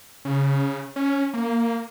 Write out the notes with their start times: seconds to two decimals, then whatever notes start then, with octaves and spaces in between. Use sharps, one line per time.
0.25 C#3
0.96 C#4
1.34 A#3